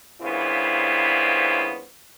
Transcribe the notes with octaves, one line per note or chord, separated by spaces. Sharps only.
G2 A#2 C#3 B3 E4 C5